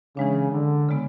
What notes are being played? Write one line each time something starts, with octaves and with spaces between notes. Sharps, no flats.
C#3 E3 G#3 D4
D3
C#3 G#3 B3